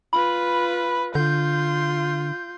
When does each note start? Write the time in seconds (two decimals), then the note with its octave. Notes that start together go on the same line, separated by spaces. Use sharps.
0.13 F4 B4 B5
1.15 D3 F4 C6 G6